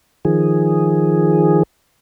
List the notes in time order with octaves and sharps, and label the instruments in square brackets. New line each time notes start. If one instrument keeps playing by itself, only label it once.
[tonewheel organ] D#3 F3 G#4